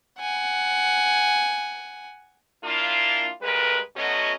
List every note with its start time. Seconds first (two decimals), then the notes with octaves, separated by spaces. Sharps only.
0.19 F#5 G#5
2.64 A#3 D4 E4 F4
3.42 D2 G2 G#3 A#4 B4
3.97 B2 F#3 A3 C#4 F#4 D#5